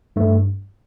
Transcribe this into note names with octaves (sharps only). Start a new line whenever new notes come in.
G2 A3